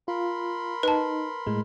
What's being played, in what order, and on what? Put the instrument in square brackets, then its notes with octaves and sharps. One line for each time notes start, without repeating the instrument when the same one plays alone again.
[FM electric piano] F4 [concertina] A#4 B5 C6
[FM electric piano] D#4 [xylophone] B4 A5
[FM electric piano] A2 G#3